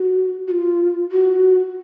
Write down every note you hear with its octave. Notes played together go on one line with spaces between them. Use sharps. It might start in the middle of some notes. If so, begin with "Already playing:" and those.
Already playing: F#4
F#4
F4
F#4